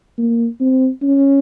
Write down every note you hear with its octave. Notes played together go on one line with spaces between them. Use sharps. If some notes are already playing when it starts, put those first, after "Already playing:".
A#3
C4
C#4